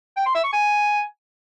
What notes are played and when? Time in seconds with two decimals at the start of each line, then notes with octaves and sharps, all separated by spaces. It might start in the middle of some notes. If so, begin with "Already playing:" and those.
0.17 G5
0.26 C6
0.35 E5
0.44 C#6
0.53 G#5